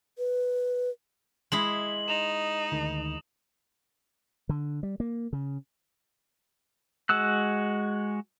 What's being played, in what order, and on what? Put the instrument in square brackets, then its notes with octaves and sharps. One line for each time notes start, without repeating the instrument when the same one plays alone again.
[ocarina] B4
[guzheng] G#3 E4 B5 [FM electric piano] C6 [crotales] D#6 F#7
[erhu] D#4 [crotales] E7 F7
[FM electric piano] D2 D#3
[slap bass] D3
G3
A#3
C#3
[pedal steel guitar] G#3 F#4 E6 F#6